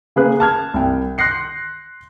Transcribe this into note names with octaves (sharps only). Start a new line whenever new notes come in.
C#3 A#3 G#4 B4 F#6
A5 F6 G#6
C2 G5
C6 F#6 G6 A#6 C7 C#7